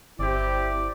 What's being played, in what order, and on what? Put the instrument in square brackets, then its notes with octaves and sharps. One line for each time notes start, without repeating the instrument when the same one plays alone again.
[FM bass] G1 [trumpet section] C4 G4 [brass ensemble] E4 [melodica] D5